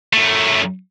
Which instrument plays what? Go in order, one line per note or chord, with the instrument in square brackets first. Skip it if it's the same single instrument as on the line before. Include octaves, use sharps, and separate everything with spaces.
[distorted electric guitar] F#2 A3